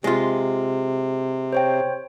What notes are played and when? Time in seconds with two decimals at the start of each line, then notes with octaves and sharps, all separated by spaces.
0.04 C3 G#3 F4
1.53 C5 C#5 G5